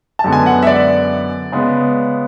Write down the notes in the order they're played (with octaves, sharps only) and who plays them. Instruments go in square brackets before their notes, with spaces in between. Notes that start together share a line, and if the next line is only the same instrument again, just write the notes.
[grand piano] A5
F#2 D3 G#3 B3
G#5
F#5
E5
D5
C#3 G#3 B3